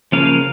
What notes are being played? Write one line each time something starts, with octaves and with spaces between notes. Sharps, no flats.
C#3 F3 A#3 C#4 F5